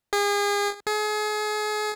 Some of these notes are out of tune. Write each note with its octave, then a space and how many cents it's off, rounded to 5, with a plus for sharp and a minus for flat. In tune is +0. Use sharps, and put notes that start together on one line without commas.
G#4 -35
G#4 +35